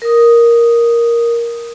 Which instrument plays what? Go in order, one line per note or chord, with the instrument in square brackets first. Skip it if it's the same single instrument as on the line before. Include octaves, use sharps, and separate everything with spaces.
[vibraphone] A#4 D#6